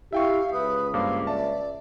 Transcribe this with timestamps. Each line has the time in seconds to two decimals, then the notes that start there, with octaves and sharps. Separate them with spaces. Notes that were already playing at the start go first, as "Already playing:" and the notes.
0.13 E4 G4 E5 F5 G5 C#6
0.53 C#2 B4 D#6
0.94 G2 A#3 C5 F5 D6
1.27 D5 E5 A5